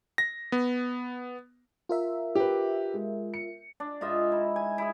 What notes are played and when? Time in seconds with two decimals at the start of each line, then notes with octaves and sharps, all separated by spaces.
0.18 A#6
0.52 B3
1.89 F4 A#4 E5
2.35 G4 B4
2.94 G#3
3.34 C#7
3.80 D4
4.01 G#2 F4 D#5 E5
4.32 E4
4.56 G#5
4.78 E4 G#4